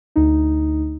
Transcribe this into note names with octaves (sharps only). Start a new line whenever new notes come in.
D2 D#4